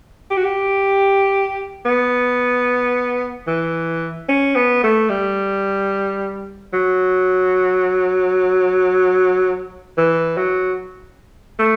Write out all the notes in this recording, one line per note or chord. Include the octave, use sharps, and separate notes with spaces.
G4
F#4
G4
B3
E3
C#4
B3
A3
G3
F#3
E3
F#3
A3